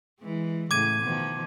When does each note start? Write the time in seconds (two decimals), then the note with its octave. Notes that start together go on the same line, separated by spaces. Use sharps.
0.21 E3 G#3
0.71 A2 C#3 D6 G#6 D#7
1.02 B2 D#3 F3